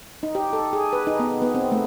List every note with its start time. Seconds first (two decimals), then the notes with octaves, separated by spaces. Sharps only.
0.23 D#4
0.35 G4
0.53 A4
0.73 G#4
0.93 B4
1.07 D#4
1.20 B3
1.42 B3
1.55 C4
1.72 A3